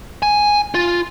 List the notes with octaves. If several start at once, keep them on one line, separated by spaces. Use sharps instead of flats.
G#5
F4